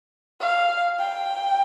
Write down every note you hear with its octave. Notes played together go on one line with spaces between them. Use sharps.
F5
G5